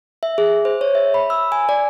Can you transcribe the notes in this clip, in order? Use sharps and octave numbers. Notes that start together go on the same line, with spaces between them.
E5
G#4
C5
C#5
E5
B5
E6
G#5
D5